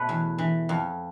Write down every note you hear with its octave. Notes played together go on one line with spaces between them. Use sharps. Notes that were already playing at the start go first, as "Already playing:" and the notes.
Already playing: B2 A3 A4 B4 C#5
E2
E3
F2